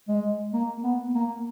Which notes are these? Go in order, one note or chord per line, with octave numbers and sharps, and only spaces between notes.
G#3
A#3
B3
A#3